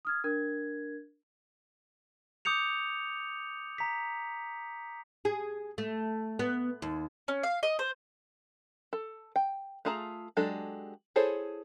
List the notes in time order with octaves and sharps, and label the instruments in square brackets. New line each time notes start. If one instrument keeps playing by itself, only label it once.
[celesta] D#6 F6 G#6
D4 A#4 G#6
[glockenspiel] D6 D#6 G6 C#7 F7
A#5 B6
[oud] G#4
A3
B3
D#2
[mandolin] C#4
F5
D#5
C5
[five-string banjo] A4
G5
A3 F4 G#4 A5 A#5
F#3 G#3 D4 G4 A4
E4 G#4 A4 C5 C#5